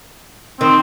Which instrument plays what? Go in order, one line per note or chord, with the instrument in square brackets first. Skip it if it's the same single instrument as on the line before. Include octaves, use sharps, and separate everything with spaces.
[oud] D#3 [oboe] C4